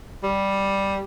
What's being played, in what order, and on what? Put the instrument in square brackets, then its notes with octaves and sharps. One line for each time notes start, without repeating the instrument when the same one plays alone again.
[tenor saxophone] G3